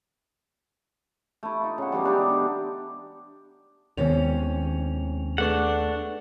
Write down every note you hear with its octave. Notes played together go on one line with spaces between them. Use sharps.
A3 E4
D#4 F4
C#3 F#5
B2 E3 F#3 G3
G#3 D4 D#4 G4
D3
D#2 C3 D#3 G#3 B3 C#4 F7
A3 D4 G#4 B4 F#5 C#6